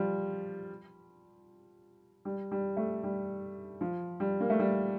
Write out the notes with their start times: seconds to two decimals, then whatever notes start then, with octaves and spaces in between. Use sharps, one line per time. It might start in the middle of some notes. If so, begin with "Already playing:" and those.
Already playing: F3 G3
2.25 G3
2.51 G3
2.77 A3
3.04 G3
3.81 F3
4.20 G3
4.40 A#3
4.50 A3
4.59 G3